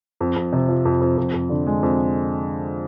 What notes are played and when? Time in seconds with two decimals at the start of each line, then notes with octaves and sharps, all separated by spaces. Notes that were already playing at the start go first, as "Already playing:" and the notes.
0.21 F2
0.36 F2
0.53 C3
0.69 F3
0.85 F2
1.01 F2
1.18 F2
1.34 F2
1.49 D3
1.67 G#3
1.83 F2